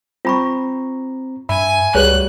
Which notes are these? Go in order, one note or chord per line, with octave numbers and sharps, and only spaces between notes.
C4 F4 A#5 B5 C#6
G2 E5 G#5 B5
C#2 G3 A3 F#4 G#4 B4 C#5 F#6